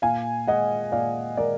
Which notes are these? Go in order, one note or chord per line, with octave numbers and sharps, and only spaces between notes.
A#2 F5 G#5
G#3 D#5 F#5
A#2 D5 F5
G#3 A#4 D5